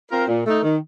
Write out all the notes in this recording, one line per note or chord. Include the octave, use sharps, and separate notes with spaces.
C4 F4 A#4
A#2
A3 D#4
D#3